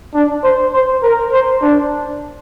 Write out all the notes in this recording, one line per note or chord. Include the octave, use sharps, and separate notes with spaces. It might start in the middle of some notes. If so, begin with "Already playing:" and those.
D4
C5
C5
A#4
C5
D4